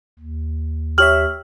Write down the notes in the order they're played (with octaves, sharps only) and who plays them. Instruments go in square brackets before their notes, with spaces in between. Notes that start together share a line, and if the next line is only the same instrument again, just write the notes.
[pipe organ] D#2
[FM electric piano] G4 C#5 E5 [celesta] F6 F#7